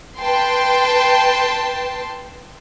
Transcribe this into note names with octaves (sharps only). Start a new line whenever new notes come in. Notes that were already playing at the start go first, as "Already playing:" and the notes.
B4 G5 A5 C6